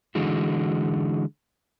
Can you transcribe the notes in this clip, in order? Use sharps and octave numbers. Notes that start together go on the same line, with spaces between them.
D3 E3 G#3 F#4